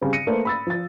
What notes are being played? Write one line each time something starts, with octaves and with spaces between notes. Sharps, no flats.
C#3 G3 C4
A#6 C#7 D#7
A3 A#3 A4 B4 C5
B5 E6 A6
F3 A6